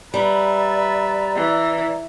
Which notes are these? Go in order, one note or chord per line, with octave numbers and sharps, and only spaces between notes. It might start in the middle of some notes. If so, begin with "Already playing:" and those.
G3 B4 D5 E5 A#5
E3